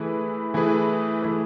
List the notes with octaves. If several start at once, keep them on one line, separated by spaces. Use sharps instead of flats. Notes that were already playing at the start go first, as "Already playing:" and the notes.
Already playing: E3 A3 E4 G#4 B4
E3 A3 E4 G#4 B4
E3 A3 E4 G#4 B4